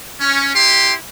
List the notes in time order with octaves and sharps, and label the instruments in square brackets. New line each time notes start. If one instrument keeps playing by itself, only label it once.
[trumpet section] C#4
E4 G4 C6